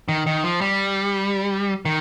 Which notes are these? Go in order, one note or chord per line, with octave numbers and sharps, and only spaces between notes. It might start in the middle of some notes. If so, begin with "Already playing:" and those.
D#3
D#3
F3
G3
D#3